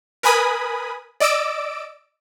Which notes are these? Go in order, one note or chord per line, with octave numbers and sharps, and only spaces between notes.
A#4 B4 G#5 B5 D#6
D5 D#5 D6 E6 D7